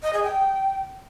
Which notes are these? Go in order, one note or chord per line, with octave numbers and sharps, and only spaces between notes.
D#5
G#4
G5